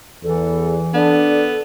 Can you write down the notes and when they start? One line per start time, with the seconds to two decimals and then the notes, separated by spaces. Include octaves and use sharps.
0.23 E2 E3 A4
0.94 B3 D4 A4